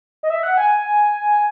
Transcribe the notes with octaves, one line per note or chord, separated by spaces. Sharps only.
D#5
E5
F#5
G#5